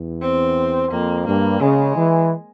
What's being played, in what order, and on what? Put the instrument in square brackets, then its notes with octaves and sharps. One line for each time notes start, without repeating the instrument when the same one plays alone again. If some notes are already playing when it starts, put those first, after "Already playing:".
Already playing: [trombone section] E2
[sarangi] C4
[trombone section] F2 [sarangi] A#3
[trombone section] G2 [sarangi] A#3
[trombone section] C#3 [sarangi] G#3
[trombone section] E3